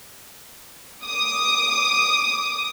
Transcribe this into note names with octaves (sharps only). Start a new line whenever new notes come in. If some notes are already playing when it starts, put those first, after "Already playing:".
D6 D#6